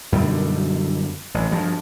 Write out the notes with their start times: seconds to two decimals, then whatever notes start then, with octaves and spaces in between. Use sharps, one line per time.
0.12 F#2 B2 D3 G3
1.34 A1
1.51 G2 F3